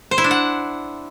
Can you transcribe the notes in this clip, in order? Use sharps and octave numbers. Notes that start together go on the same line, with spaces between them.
C5
E4
D4
F#5